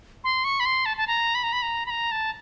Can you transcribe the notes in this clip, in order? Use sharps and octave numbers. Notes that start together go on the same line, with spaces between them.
C6
C#6
B5
C6
A5
A5
A#5
B5
A#5
B5
A#5
B5
A#5
A5